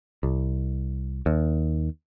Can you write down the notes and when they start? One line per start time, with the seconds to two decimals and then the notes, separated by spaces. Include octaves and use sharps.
0.23 C2
1.26 D#2